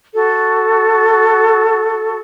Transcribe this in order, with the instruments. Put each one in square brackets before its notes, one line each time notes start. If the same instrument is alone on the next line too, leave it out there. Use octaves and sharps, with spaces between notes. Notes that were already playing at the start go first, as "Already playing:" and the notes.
[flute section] F#4 A4